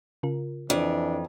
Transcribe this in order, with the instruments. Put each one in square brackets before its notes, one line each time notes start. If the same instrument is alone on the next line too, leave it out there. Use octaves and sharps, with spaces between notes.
[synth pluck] C#3 F4 A#4
[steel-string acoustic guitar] F2 [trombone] E3 [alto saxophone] D4